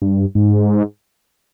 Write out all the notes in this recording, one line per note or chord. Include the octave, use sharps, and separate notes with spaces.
G2
G#2